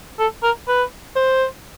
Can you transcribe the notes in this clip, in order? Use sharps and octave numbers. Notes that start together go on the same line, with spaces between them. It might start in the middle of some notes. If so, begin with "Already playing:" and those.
A4
A#4
B4
C5